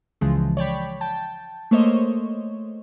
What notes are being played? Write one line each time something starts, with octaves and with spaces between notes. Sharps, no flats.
C#2 C#3 E3 F3 G#3
C#5 D5 G5 B5
G5 A5
A3 A#3 C5 C#5 D#5